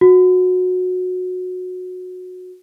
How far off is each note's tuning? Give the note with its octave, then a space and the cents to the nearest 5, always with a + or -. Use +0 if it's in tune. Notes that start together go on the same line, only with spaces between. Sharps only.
F#4 -20